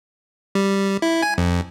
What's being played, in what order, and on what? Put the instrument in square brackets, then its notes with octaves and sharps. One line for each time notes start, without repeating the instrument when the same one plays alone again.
[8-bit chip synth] G3
E4
G#5
F2